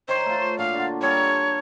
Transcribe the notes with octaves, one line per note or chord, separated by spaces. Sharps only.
D#3 C5 C#5
A3 F4
A#2 D4 F#4 F5
D3 F4
G3 A4 A#4 C#5